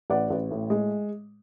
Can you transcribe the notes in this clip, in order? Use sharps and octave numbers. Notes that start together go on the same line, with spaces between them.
A1 D5 F#5
A1
A2
G#3